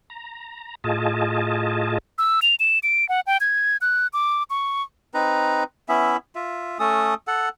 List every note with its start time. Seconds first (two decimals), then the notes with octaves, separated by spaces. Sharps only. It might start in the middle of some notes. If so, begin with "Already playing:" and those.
0.10 A#5
0.84 A2 F4 G#4 D#5 A5
2.18 E6
2.42 F7
2.60 E7
2.83 D7
3.09 F#5
3.27 G5
3.41 G#6
3.81 F#6
4.13 D6
4.50 C#6
5.14 C4 D#4 B4 A#5
5.89 B3 C#4 E4 E5
6.35 F4 E5
6.79 A3 C#4 A4 D#6
7.27 A4 F#5